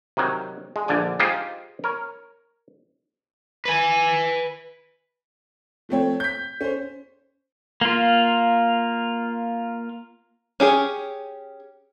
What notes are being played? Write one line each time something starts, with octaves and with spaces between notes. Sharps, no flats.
C3 D#3 F#3
G#3
A#1 D3 D5 G#5
D#4 F4 G4 G#4 C5
A#4 C#5
B4 G#5
F3 A3 C4 C#5
G6 B6
C#4 C5
A#3 F4
C#4 G4 G#4